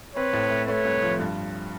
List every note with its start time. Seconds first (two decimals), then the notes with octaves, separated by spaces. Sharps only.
0.16 C4 B4 C#5
0.33 A2
0.50 A3
0.68 A3 B4 C#5
0.85 C2
1.02 F3
1.20 G2